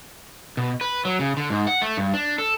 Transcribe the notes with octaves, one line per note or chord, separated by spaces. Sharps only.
B2
B4
F#3
C#3
D3
G#2
F#5
A3
G2
D4
A4